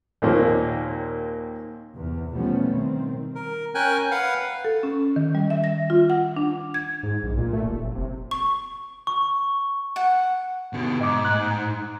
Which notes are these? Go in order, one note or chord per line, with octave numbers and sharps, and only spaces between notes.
D#2 A#2 D#3 A#3 C4 C#5
E2 C3
B2 F3 G3 A3 B3 C#4
D#3 C4
A#4
C#4 A#4 G5 G#5 F#6
B4 F5 F#5
A4
C#4
D#3
G3
E5
A#6
F4
F#5
D4
G#6
G#2
A#1
A#2
A3
D#1
F#1
C3
C#6
C#6
F#5
B2 D3
G#2 D#5 D6
A2 F#6